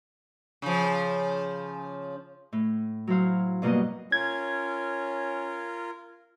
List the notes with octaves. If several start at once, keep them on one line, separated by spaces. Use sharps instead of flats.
C#3 F3
A2
F#3 E4 C5 F5
G2 B2 G3 A#3 F#4 D#5
C#4 F4 A#4 G#6